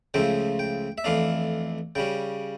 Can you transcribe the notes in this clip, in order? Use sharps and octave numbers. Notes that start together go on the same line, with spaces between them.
C#2 C#3 F3 A3 G5
G5
E5
F2 E3 A3 D4 F5
C#3 G3 C#4 G5